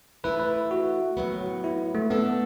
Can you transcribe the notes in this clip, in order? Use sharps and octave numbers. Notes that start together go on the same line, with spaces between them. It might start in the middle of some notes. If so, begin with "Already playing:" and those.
E3 A3 E4 A4 B4
B4
F#4
A2 F#3 B3
E4
A3
D3 A3 B3 D4 A4 D5